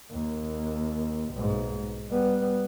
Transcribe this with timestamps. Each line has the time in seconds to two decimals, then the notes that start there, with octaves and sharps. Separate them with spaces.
0.11 D#2 A#3
1.33 B1 G#2
2.10 G3 B3